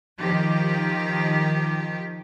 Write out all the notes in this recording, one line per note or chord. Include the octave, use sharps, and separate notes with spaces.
D#3 F3 G4